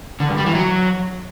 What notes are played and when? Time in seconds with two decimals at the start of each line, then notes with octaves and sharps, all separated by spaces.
0.20 D3
0.29 G2
0.37 G3
0.46 E3
0.55 F#3